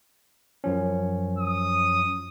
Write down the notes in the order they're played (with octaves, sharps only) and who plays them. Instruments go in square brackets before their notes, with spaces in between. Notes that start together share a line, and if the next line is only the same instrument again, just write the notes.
[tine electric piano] F#2 F3 C#4
[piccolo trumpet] D#6